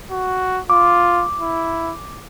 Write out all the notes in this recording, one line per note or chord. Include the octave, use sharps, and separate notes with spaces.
F#4
F4 D6
E4